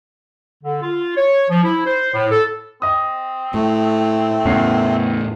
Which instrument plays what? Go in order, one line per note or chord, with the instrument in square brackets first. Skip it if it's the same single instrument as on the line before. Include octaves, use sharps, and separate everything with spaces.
[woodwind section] D3
F4
C#5
F3
E4
C5
A2
A4
[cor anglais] C4 [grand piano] D#5 D#6
[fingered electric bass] A2 [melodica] A3
[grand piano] E2 C#4 C7 [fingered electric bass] A2 C#3